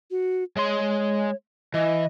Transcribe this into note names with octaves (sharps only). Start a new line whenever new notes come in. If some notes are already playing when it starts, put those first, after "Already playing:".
F#4
G#3 C#5 C6
E3 D#5